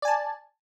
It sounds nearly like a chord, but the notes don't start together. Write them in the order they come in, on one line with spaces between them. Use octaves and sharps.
D5 G#5 A5